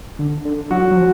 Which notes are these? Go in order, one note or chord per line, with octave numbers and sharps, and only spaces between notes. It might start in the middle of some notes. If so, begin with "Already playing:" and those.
D3
D3
F#3 F#4
F#3
F3